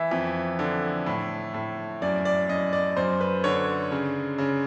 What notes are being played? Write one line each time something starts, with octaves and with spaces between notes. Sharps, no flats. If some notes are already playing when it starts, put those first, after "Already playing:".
Already playing: E3 E5
F2
D3
A2
A2
F#2 D5
D5
F#2 D#5
D5
F#2 C5
B4
D3 C#5
C#3
C#3